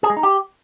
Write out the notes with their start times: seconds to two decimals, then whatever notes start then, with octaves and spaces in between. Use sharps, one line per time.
0.03 G#4
0.10 G#3
0.17 D#4
0.23 G4